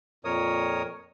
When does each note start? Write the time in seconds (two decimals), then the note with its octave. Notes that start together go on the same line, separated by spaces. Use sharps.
0.25 F2 A#2 A#4 C#5 D#6